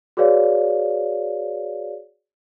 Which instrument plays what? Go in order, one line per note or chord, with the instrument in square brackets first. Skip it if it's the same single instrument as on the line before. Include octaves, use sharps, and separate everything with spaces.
[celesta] F#4 G#4 B4 C#5 D5 F5